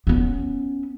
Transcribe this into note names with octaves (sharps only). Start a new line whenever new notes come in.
B3 C#4